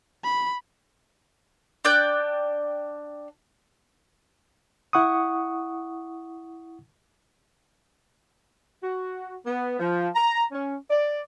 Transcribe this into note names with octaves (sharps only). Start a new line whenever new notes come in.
B5
D4 D5 G5 F#6
E4 F#5 C#6 D#6
F#4
B3
F3
A#5
C#4
D5